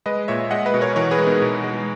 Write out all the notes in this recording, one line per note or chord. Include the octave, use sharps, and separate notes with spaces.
G#3 B4 D#5
A#2 C#5 E5
G#3 D#5 F#5
B4 D#5
B2
A#4 C#5
E3 A#4 C#5
G#4 B4
G#3
B3 D#4
B2
G#3